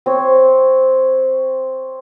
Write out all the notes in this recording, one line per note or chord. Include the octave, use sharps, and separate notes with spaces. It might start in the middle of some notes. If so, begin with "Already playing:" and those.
C4 C#5